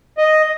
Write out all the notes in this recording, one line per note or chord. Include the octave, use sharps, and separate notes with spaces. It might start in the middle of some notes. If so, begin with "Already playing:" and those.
D#5